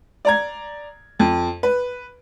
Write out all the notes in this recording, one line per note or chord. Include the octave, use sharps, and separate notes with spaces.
D5 A#5 G#6
F2
B4